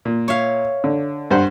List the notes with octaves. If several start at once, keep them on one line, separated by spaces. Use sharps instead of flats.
A#2
C#5 E5 F5
D3
G2 C5 F#5